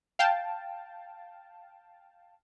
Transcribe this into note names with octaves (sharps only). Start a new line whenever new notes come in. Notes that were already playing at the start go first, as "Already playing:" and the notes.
F5 G5 A5